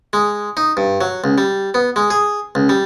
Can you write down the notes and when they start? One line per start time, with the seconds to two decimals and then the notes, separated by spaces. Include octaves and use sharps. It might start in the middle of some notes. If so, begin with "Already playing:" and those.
0.13 G#3
0.57 D#4
0.77 G2
1.01 F#3
1.24 C#2
1.38 G3
1.74 B3
1.96 G#3
2.10 G#4
2.55 C#2
2.69 G3